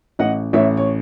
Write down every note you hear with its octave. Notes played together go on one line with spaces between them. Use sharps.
A1 D#5 F#5
A1 C#5 E5
C#5